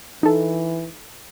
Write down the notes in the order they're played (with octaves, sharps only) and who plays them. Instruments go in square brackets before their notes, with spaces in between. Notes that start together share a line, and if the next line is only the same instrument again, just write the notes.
[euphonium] E3 [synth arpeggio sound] D#4 A4